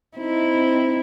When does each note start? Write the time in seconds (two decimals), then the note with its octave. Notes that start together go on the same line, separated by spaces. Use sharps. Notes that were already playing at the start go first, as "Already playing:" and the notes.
0.17 C4 D#4 E4